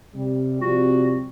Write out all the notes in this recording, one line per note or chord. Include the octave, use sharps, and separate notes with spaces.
C3 G3
C3 F3 G3 F#4